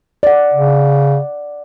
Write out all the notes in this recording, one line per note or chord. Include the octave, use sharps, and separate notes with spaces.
D5 F#5
C#3